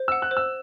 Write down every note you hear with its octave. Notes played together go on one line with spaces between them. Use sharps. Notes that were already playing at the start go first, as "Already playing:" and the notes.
Already playing: C5
F#5 E6
F#6
C5
E6